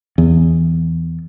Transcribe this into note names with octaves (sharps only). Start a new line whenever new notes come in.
E2